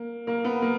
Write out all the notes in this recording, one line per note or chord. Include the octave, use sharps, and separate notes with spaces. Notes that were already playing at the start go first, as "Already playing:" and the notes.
Already playing: A#3
A#3
B3
A#3